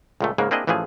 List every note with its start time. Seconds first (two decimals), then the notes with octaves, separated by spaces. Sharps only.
0.21 C#2 A#2 A3
0.38 G#2 C#3 G#3 A#3
0.51 A#3 C4 D4 E4 G#4 D#5
0.67 A1 E3 F3 A3 G#4